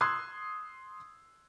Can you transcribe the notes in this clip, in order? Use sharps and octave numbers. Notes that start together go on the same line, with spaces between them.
C6 D#6 E6 F#6 G#6 C7